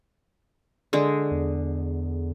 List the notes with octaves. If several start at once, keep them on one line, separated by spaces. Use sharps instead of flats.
D3 G#3
E2